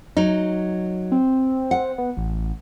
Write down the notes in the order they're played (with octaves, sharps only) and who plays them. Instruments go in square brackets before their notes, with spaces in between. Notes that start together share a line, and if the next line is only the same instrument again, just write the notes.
[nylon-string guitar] F#3 D#4
[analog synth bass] C4
[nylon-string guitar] F#5
[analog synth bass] B3
A1